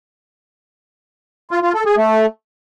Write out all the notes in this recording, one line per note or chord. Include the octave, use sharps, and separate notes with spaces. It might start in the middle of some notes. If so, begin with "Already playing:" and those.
F4
F4
A4
G#4
A3